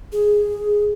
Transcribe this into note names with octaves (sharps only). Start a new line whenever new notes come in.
G#4